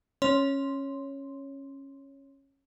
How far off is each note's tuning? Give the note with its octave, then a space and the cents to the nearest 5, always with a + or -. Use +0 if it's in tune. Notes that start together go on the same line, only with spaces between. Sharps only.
C#4 -15 C#5 +0 C6 +0